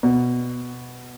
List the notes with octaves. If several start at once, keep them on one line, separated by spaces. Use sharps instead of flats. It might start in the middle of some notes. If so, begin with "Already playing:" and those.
B2